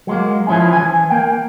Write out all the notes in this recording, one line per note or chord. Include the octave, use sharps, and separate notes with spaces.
F#3 G#3 A#3
E3 F3 C#4 E4 G#4
E3 G#5
A#3 G5